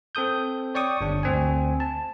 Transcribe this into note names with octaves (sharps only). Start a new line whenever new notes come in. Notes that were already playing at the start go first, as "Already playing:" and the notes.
C4 A4 D#6 G6
C#5 D5 G5 C#6 D#6
G1 D4
D2 C4 G#5
A5